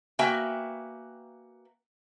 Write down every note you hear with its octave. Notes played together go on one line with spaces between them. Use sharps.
A#3 F#4 B4 E5 G5 G#5